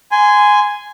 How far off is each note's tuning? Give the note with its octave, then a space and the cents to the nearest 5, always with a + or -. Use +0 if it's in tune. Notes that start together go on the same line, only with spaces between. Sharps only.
G#5 +0 C6 -25